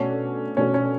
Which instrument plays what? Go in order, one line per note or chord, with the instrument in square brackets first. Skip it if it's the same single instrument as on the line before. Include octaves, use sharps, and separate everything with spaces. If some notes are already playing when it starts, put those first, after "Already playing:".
Already playing: [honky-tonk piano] B2 A3 D4 F#4 A4 [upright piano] C#4
[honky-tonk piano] B2 A3 D4 F#4 A4 [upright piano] C#4
[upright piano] C#4